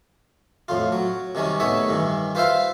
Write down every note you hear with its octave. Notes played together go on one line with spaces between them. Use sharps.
F2 A2 F4
F#3
C3 D#3 G3 C#4
A2 B3 D#4 C#5 E5
G2 D#3 E3
F4 B4 C5 E5 F5